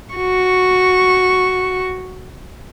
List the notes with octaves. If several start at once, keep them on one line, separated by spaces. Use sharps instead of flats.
F#4 C#6